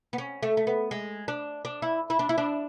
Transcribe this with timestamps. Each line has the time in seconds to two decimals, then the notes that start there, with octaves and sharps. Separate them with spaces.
0.13 B3
0.18 C#4
0.43 A3
0.57 A3
0.67 B3
0.91 G#3
1.28 D4
1.65 D4
1.82 E4
2.10 E4
2.19 D4
2.29 E4
2.38 D4